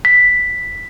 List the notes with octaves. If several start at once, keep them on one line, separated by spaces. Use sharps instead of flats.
B6